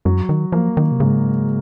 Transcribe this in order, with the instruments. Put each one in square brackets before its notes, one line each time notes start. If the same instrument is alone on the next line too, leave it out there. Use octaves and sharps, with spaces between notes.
[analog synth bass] F#2 [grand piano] F#3
[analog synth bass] D#3
[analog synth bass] F3 [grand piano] A#3
[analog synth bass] D#3
C3
[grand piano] G#2 [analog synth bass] C#3